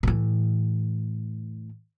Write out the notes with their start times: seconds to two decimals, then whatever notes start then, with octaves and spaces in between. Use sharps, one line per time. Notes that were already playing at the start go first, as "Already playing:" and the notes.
0.03 A2 E3